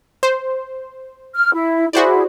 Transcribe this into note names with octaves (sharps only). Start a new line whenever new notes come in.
C5
F6
E4
E4 F#4 G#4 C5 D5